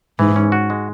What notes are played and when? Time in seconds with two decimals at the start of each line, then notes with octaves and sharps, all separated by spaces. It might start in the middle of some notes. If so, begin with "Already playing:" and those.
0.19 G#2 E3
0.36 C#4
0.52 F#4
0.70 G#3